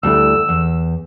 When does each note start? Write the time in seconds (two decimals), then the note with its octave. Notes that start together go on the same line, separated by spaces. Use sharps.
0.03 D2 G3 E4 E6
0.49 E2